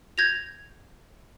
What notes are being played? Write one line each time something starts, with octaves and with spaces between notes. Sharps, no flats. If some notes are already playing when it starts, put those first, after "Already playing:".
G6 G#6 A#6 F7